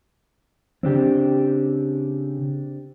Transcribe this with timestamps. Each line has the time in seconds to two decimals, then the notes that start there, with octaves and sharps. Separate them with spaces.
0.83 C#3 C4 D4 G4